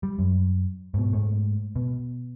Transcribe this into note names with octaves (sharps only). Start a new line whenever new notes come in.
G3
F#2
G#2 B2
G#2 A3
B2